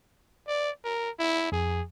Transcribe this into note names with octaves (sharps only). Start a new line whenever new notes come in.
D5
A#4
E4
F2 G#4